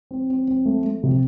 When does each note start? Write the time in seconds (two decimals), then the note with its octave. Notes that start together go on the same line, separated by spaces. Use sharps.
0.11 C4
0.30 C4
0.48 C4
0.66 A3
0.84 A3
1.03 C3